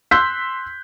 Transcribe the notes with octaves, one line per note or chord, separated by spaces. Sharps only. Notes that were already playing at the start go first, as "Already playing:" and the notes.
C6 E6 F#6 G6 B6